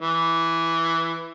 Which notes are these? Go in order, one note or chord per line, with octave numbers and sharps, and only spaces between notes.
E3